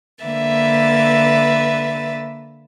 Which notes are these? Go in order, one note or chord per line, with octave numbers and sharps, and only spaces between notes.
D3 A#3 B4 E5 A6